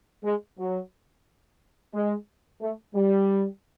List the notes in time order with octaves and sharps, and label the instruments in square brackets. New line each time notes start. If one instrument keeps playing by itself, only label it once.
[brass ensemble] G#3
F#3
G#3
A3
G3